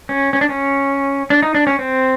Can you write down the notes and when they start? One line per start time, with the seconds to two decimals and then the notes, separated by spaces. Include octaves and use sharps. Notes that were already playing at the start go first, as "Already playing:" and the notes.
0.09 C#4
0.33 C#4
0.41 D4
0.49 C#4
1.30 D4
1.43 D#4
1.55 D4
1.67 C#4
1.79 C4